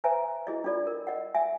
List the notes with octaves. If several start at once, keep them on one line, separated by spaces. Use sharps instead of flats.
B4 C5 E5 G#5 A#5
E4 G#4 D#5
D4 F4 A4 D5
A#4
D#5 F#5
E5 G#5